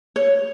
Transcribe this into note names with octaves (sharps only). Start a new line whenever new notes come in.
C#5